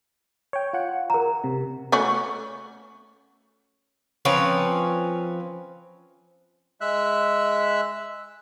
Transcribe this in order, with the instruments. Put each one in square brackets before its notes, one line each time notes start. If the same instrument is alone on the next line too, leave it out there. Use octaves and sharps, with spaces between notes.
[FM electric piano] C#5 G5
F4 F#5
[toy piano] A#4 A#5
[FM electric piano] C3
[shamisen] A3 C#4 F#4
[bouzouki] F3 C4 C#4 B4
[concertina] G#3 E5 F#6